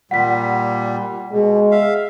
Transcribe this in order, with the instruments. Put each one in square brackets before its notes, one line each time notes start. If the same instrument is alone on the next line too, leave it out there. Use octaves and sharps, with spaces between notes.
[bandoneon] A#2 G3 [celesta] F#5 B6
[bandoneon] B2 [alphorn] G#3
[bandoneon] E5 F5